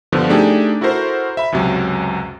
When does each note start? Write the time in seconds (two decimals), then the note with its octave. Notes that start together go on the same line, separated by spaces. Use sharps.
0.12 G2 D3 F3 B3
0.30 A3 D4 D#4 G4 G#4
0.81 E4 F#4 A4 A#4 C5
1.37 E5 B5
1.52 C#2 F#2 C3 F#3